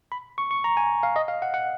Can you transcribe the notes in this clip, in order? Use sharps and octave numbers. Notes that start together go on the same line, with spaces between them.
B5
C#6
C#6
A#5
G#5
F5
D#5
F5
F#5
F#5